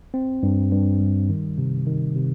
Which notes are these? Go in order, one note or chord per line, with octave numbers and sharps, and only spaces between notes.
C4
G2
G2
G3
D#3
C3
D#3
C3